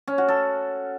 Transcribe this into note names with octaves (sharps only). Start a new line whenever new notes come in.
C#4
F#4
A4